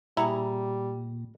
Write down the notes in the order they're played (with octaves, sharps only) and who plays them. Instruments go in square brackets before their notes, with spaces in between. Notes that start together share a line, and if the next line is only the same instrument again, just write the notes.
[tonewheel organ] A#2 [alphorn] G3 [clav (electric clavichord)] E4 [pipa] G#4 F#5 A#5